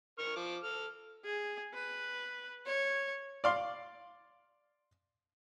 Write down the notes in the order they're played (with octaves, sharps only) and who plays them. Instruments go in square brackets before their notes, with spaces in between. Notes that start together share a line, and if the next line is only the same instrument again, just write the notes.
[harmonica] A#4 C#6 F6
F3 D6
A4 F6
[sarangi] G#4
B4
C#5
[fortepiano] D5 F5 C6